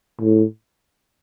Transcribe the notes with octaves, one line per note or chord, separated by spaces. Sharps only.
A2